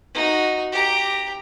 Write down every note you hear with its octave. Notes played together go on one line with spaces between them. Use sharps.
D#4 F#4
G4 A#5